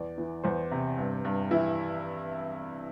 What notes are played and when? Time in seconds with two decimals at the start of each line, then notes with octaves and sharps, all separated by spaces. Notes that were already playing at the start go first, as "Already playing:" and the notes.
Already playing: E2 D5
0.18 E3
0.44 E2 C5
0.71 C3
0.97 G2
1.25 G2
1.51 E3 E4